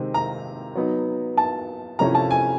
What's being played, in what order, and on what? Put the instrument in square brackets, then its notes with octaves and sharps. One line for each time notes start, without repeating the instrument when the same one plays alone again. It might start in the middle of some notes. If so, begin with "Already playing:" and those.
Already playing: [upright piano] C3 D#3 G#3 C4
A#5
F#3 B3 D#4
A5
C3 F3 A3 C#4 E4 A#5
A5
G#5